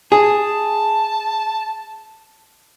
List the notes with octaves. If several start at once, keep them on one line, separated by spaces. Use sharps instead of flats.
G#4 A5